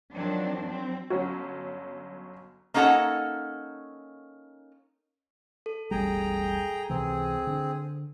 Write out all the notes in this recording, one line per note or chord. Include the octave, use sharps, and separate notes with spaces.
D#3 F3 F#3 C4 D4
F#3 C4
G1 F#3 C#4 F#4
A#3 C#4 D#4 A4 F#5 A5
A4
E1 A1 G3 G#4 G5 A#5
C#2 C3 E3 C4 G#4
D3